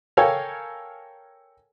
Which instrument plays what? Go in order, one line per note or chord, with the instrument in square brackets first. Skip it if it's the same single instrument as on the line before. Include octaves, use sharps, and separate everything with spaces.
[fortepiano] A4 A#4 C#5 F5 G5 G#5